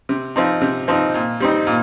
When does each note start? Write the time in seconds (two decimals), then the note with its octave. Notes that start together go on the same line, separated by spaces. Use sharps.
0.09 C3
0.36 F3 C4 D#4
0.61 C3
0.88 F3 C4 D#4
1.14 A#2
1.40 G3 C4 D#4
1.67 A#2